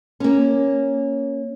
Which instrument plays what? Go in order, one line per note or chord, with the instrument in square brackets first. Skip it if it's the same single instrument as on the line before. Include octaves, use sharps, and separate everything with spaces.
[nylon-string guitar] A#3 C#4